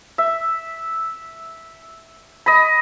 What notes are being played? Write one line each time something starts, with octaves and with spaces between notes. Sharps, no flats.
E5
D#5 B5